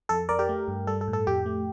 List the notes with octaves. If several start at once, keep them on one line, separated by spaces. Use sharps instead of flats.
F2 A4
F2 A#4 D5
G4 A#4
A3
G2
G3 A4
A4
A2
A4
F2 G4
A3